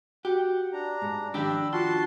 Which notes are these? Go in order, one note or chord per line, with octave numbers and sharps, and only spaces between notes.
F#4 G4 F#5
D4 A#5
G#2
D#3 F3 D4 G4 B5 E6
F4 F#4 A5 C6